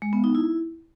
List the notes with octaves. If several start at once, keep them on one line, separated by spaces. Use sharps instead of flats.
G#3
B3
D#4
E4